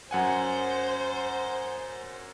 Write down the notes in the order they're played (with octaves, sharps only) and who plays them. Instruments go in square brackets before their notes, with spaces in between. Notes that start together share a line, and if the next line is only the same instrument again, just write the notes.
[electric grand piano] F#2 F#5 G#5 [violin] C5